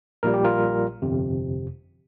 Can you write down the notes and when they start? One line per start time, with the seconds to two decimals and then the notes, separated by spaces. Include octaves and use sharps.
0.23 A#1 A#2 G3 A#4
0.34 G4
0.45 F4 A#4
1.02 G1 F2 C3